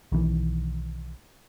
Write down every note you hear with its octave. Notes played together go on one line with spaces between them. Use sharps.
B1 D#3 E3